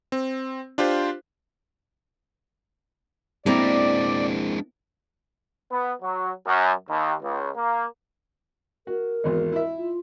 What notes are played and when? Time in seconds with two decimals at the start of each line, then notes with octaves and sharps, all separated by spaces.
0.12 C4
0.78 D4 F4 G4 C5
3.46 G#3 A#3 C4 D4 E4 D5
5.71 B3
6.02 F#3
6.47 F#2
6.89 D#2
7.22 C#2
7.56 A#3
8.87 F#4 A#4
9.24 G#1 E2 G#3
9.52 E4 E5
9.78 F4